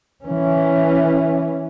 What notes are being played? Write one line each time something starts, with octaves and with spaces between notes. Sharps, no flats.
E3 C#4